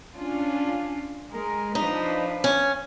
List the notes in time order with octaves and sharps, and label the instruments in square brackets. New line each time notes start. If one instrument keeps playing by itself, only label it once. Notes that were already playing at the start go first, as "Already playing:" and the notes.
[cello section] C#4 D4 F4
G#3 A#4
[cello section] F3 D4 B4 [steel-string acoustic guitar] D#4
[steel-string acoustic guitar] C#4